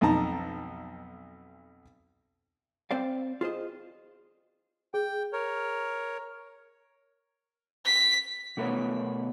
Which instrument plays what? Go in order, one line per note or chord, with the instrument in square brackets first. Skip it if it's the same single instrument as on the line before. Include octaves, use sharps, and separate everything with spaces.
[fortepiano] B1 F2 D#4 A5 A#5
[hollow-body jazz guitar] C4 C5 D5 F5
F4 G#4 C5 D#5
[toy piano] G#4 [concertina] G5
[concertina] A#4 C#5
[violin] B6
[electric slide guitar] B2 A3 B3 A#4 B4 C#5